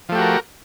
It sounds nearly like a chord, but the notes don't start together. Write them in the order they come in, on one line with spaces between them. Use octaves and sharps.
F3 A3 G4 F#4 A#4